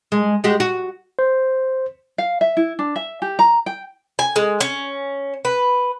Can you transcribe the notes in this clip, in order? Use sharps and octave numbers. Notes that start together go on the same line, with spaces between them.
G#3
G#3 F#4 G4
F#4
C5
F5
E5
E4
D4
E5
G4
A#5
G5
G#5
G#3
C#4
B4